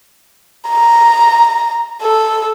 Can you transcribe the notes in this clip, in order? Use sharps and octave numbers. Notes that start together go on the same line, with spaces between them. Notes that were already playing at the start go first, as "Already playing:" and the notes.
A#5
A4